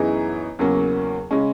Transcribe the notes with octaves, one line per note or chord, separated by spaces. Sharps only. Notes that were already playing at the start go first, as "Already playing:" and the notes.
Already playing: F#2 E3 B3 D#4 G#4
E2 C#3 F#3 A#3 C#4
C#3 G#3 C#4